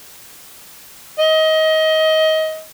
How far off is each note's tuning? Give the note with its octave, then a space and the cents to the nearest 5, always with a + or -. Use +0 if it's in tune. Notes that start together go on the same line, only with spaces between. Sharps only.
D#5 +25